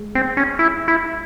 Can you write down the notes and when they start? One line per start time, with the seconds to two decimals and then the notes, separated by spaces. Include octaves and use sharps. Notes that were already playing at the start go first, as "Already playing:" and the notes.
Already playing: G#3
0.15 C4
0.37 C#4
0.59 E4
0.88 E4